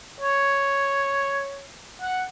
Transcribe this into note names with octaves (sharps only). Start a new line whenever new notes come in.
C#5
F#5